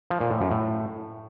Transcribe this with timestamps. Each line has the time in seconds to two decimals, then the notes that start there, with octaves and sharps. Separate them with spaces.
0.10 F3
0.20 A#2
0.31 A2
0.41 F#2
0.51 A2